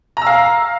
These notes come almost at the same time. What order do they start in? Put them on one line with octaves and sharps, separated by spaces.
A#5 E6 F5